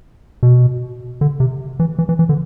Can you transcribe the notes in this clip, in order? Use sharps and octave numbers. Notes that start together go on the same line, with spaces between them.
B2
D3
C3
E3
E3
E3
E3
D3